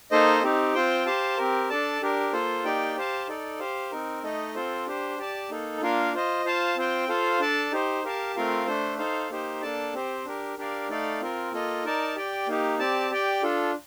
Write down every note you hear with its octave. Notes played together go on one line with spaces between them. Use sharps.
A#3 D#4 A4 C5 D#5
C4 D#4 G4
C4 F4 C5 G5
G4 C5 F5 A5
C4 G4 A#4
D4 A4 D5 A5
D4 G4 A#4
A#3 F4 A4 C5
A#3 D#4 G4 D5 G5
G4 C5 F5 A5
D#4 A4 D5
G4 C5 F5
C4 D#4 A#4
A3 D#4 A4 D#5
C4 F4 A4 C5
D4 G4 C5
G4 D5 A5
A#3 D#4 A4
A#3 D4 F4 A#4 F5
F4 C5 D#5
F4 C5 F5 A5
C4 F4 C5 G5
F4 A4 C5 F5
D4 A4 D5 A5
D#4 G4 C5
G4 A#4 F5 A5
A3 C4 F4 A#4 F5
A3 D4 A4 C5
D#4 A4 C5 F5
A#3 D#4 G4 C5
A#3 D4 A4 D5 A5
C4 G4 C5
D4 G4 A#4
D4 G4 A#4 D5 F5
A3 D#4 A4 D5 F5
C4 F4 A#4
A#3 F4 A4 D#5
D#4 A#4 D5 A5
G4 D5 G5
A#3 D#4 G4
C4 G4 D5 A5
G4 D5 G5
D4 F4 A4